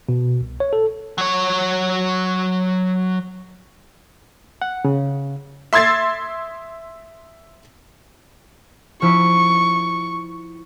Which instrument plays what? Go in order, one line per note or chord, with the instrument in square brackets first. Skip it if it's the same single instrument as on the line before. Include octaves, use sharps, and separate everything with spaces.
[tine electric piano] B2
C2
C#5
A4
[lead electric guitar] F#3 C#5
[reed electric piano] F#5
C#3
[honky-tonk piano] E5 C6 E6 G#6 A6 C7
[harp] F3 E4 B6 [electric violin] C#6